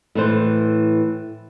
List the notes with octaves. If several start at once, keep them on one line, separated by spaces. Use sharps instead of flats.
A2 E3 C5